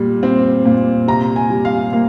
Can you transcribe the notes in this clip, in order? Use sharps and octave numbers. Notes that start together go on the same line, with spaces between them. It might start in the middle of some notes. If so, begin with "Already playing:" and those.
Already playing: A#2 G3
C4
A#2
C3 A#5
G#5
G3
F5
A#3 F5